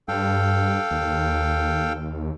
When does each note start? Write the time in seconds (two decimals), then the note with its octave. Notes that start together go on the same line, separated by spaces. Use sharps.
0.08 G2 A4 F5 G5
0.91 D#2